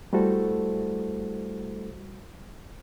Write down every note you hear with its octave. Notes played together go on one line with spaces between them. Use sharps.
G3 A3 E4 F#4 A4 C5